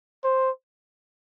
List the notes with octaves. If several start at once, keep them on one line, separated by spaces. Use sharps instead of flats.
C5